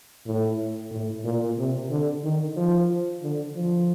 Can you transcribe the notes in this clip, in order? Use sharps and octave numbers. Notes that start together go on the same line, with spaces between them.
A2
A2
A#2
C3
D3
D#3
F3
D3
F3